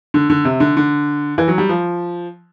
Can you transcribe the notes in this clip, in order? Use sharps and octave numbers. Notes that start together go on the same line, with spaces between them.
D3
D3
C3
D3
D3
E3
F#3
G3
F3